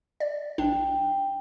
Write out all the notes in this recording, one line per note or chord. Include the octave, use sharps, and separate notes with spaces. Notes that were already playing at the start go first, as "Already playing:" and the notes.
D5
A#1 D4 G5